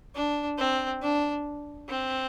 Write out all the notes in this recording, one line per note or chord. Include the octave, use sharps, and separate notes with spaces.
D4
C4
D4
C4